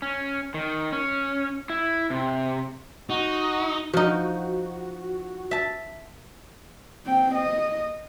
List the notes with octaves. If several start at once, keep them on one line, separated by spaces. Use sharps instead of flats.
C#4
D#3
C#4
E4
C3
D#4 F#4
F3 D#4 F#4
E5 A5
C4 G5
D#5